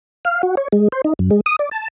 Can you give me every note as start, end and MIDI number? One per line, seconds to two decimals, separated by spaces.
0.25 0.42 77
0.43 0.55 66
0.57 0.68 73
0.72 0.88 56
0.92 1.02 72
1.04 1.13 63
1.19 1.30 42
1.31 1.41 56
1.46 1.56 87
1.59 1.69 74
1.71 1.88 81